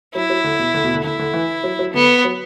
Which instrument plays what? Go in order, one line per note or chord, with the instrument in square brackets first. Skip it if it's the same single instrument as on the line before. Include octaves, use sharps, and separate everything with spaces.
[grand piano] F#3 [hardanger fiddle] E4
[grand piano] F#3
D3
B2
D3
B2
D3
[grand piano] D3 [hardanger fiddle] E4
[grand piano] D3
E3
F#3
F#3
[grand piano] D3 [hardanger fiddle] B3
[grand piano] F#3